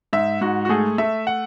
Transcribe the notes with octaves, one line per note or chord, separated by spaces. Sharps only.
G#2 E5
G#2 F#4
F#4
A3 G#4
A3 E5
F#5